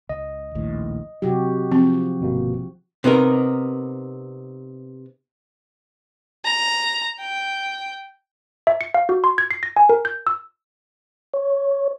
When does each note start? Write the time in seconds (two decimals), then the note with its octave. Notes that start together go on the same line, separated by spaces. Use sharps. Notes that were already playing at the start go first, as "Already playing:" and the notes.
0.09 C#2 D#5
0.55 A#1 D#2 A2
1.22 C3 F#3 F#4 G4
1.72 F3 C4
2.20 G1 B2 A#3
3.04 C3 B3 D#4 A#4
6.45 A#5
7.20 G5
8.67 E5
8.81 C#7
8.94 F5
9.09 F#4
9.24 C6
9.38 G#6
9.51 C7
9.63 A#6
9.76 G#5
9.89 A#4
10.05 G6
10.27 E6
11.34 C#5